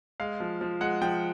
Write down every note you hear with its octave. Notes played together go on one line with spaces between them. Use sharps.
G#3 F5
F3
F3
G#3 F#5
F3 G5